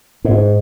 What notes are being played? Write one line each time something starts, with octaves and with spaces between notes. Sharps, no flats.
G#2